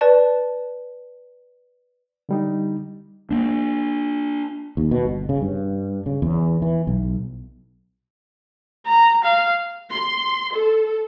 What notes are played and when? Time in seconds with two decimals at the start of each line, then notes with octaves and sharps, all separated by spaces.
0.01 B4 D5 A5
2.29 D3 G3 D#4
3.31 A#3 D4
4.77 D#2
4.91 B2
5.05 G1
5.29 C#3
5.42 G2
6.06 C#3
6.22 E2
6.62 E3
6.87 B1
8.87 A#5
9.24 F5
9.92 C6
10.56 A4